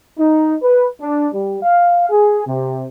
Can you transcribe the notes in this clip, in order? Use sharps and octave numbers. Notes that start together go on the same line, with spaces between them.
D#4
B4
D4
G3
F5
G#4
C3